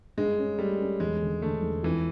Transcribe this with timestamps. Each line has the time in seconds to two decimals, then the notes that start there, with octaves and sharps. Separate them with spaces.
0.17 G2 G#3
0.38 C#4
0.59 G3 A3
0.80 C#4
1.00 E1 G#3
1.22 D3
1.42 D3 A3
1.63 E1
1.83 F2 E3